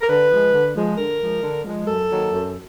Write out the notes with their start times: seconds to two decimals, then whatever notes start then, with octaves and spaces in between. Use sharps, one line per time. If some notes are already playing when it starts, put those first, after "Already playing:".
0.01 A#4
0.07 D3 B4
0.29 F3 G#3
0.52 D3
0.75 F3 G#3
0.97 D3 A#4
1.20 F3 G#3
1.42 D3
1.65 F3 G#3
1.87 F#2 A4
2.10 D#3 F#3 A#3
2.32 F#2